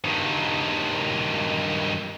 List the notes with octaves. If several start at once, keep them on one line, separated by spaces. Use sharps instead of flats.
G2 D#3